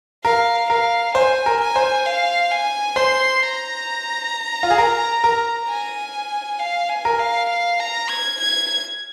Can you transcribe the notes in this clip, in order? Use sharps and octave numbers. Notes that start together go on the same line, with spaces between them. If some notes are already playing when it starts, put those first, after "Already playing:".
A#4 F5
A#4 F5
C5 G#5
A#4
G#5
C5
F5
G#5
C5 C6
A#5
F4
G#4
A#4
A#4
G#5
F5
G#5
A#4
F5
F5
A#5
G#6
G#6